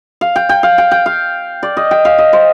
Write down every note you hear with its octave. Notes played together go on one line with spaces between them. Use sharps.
F5
G5
G5
F5
G5
G5
F5
D5
D#5
G5
F5
D#5
C5